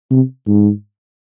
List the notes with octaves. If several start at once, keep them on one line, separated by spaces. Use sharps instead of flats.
C3
G#2